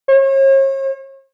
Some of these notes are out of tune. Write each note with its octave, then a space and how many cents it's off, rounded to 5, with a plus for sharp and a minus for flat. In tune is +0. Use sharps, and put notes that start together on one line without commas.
C#5 -40